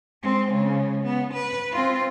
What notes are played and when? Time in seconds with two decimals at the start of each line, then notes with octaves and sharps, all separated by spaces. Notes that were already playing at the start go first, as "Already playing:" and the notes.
0.22 G#3 C4
0.51 C#3 G#3
1.03 B3
1.33 B4
1.72 C4 F4